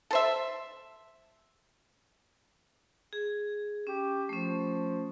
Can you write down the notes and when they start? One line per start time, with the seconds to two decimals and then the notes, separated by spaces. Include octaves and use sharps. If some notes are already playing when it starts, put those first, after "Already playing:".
0.11 A4 C5 E5
3.13 G#4
3.87 C#4 G4
4.29 F3 A3 C#4